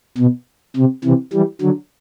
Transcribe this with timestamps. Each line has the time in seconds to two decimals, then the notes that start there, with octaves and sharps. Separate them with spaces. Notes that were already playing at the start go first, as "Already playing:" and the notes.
0.18 B2
0.76 C3
1.04 C3 E3
1.33 E3 G3
1.61 D3 F#3